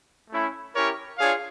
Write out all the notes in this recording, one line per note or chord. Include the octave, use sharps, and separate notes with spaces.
A3 C#4 E4
C#4 E4 G4 A#4 C#5
D4 F4 G#4 C#5 F5